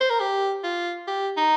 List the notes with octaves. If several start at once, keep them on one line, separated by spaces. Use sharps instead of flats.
C5
A#4
G4
F4
G4
D#4